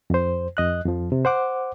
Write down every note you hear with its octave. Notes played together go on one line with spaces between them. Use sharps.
F2 C5
F2 D#5 F#6
F2 F3
C3
C5 F#5 D6